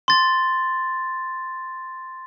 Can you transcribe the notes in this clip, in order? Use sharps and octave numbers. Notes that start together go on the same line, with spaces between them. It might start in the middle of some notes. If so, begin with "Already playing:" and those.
C6 A6